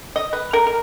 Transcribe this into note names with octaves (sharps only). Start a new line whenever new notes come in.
D#5
B4
A#4
A#4